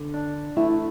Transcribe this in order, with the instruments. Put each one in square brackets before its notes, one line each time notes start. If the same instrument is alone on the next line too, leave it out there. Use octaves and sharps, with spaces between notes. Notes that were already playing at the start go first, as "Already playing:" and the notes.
Already playing: [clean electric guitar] D3
D4
[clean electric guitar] A3 [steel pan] E4